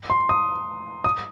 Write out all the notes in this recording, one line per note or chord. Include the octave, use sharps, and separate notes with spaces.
C6
D#6
D#6